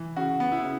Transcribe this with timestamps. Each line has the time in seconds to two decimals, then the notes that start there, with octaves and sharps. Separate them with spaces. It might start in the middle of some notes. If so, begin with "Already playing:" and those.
Already playing: E3
0.16 C#3 F#4
0.40 B3
0.52 E4
0.63 C#3